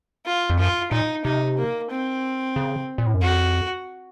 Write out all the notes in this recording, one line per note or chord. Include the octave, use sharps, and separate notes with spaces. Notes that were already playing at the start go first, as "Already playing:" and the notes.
F4
F2
F#2 F4
A#2 D#4
C3 D#4
A#3
C4
C#3
A#2
A2
F#2
F2 F#4